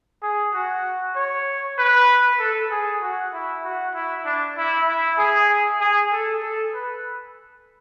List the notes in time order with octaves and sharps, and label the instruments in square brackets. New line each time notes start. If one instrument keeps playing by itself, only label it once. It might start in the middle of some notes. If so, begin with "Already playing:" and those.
[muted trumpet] G#4
F#4
C#5
B4
A4
G#4
F#4
E4
F#4
E4
D4
E4
E4
G#4
G#4
A4
A4
B4